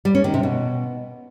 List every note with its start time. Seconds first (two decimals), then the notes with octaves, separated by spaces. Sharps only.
0.05 G3
0.15 C#4
0.24 D#3
0.34 C3
0.43 B2